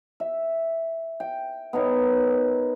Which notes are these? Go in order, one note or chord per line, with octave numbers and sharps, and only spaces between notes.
E5
G5
B3 D#4 A#4 C#5